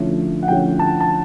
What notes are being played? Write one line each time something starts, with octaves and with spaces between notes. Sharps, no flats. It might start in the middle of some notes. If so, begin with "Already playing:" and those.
Already playing: D3 F3 A3 C#4 E4
F#5
D3 F3 A3 C#4 E4 G5
A5
A5